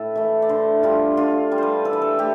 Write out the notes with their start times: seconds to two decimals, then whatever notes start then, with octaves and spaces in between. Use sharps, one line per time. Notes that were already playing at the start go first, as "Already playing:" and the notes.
Already playing: A2 A4 B4
0.15 E3 A3
0.42 D5
0.49 D3 C5
0.83 G3 D4 F4
1.17 D3 F4
1.51 G3 D4
1.58 B4 C5
1.85 E3 A4
1.93 B4
2.02 A4
2.19 A3 G4